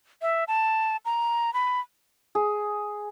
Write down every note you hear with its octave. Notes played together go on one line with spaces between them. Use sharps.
E5
A5
A#5
B5
G#4